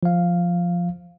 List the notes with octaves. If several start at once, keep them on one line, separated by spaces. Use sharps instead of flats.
F3 F5